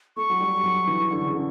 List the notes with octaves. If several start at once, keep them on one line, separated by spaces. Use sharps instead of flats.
A3 C#6
F#3
G3
F#3
E3
D3
C#3
D3